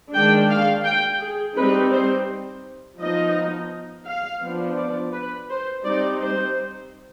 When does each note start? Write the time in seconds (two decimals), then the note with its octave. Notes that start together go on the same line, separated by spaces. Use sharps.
0.13 D#3 G#3 D4 G5
0.50 F5
0.85 G5
1.21 G#4
1.56 G3 C4 D#4 B4
1.92 C5
2.99 F3 B3 D#4 D#5
4.06 F5
4.42 F3 B3 D4
4.78 D5
5.13 B4
5.50 C5
5.85 G3 C4 D#4 D5
6.21 C5